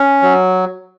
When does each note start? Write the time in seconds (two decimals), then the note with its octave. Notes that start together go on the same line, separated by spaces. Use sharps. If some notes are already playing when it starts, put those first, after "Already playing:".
Already playing: C#4
0.22 F#3